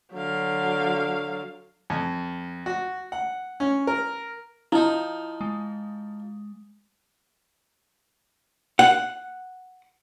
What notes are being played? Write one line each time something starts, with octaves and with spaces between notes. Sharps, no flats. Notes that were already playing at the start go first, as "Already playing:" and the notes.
D3 F#3 F5
F2
F#4
F#5
C#4
A#4
F3 D#4 E4
G#3
F#5